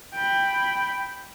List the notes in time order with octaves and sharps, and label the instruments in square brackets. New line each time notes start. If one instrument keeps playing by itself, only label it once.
[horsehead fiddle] G5 B5